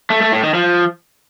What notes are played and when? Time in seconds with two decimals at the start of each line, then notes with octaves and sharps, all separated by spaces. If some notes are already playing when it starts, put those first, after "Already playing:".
0.10 A3
0.21 A3
0.32 A2
0.43 D#3
0.54 F3